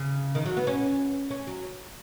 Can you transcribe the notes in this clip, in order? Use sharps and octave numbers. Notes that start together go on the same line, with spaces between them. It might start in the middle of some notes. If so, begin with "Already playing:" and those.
Already playing: C#3
D#3
F#3
B3
C#4
C#4
F#3